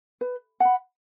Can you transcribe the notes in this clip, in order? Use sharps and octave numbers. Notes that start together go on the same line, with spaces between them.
B4
F#5 B5